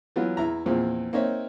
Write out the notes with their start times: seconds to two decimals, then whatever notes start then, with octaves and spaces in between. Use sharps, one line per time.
0.16 E3 F#3 B3 F4
0.37 E2 E4 A#5
0.66 E2 A#2 E3 F3 C4
1.13 A#3 C4 D#4 C#5 E5